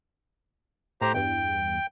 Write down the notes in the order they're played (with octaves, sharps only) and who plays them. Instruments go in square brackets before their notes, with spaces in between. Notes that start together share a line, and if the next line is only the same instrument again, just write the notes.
[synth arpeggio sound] A2 [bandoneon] G4 C5 A#5
[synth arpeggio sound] E2 G2 [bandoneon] G5